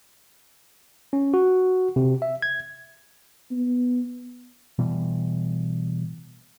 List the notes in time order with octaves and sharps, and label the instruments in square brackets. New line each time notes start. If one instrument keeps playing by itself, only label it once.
[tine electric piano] C#4
F#4
C3
E5
G#6
[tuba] B3
[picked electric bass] B2 E3 G3